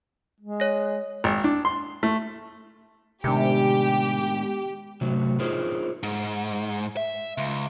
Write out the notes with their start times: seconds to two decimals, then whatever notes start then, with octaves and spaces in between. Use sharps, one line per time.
0.41 G#3
0.60 C#5 A#6
1.24 G#1
1.44 D4
1.65 C6
2.03 A3
3.24 A2 C3 D#3 G#3 B3 D4 G4
5.01 C3 F#3 A3
5.39 D#4 F4 G#4 A#4 C5 C#5
6.03 G#2
6.97 E5
7.38 C#2